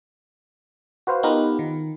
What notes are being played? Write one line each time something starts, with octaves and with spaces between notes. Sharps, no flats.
F#4 B4 C5 F5
B3 D#4 F4 G4 A#4 B4
D#3